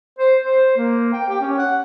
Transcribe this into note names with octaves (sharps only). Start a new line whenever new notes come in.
C5
C5
A#3
G5
G4
C#4
F#5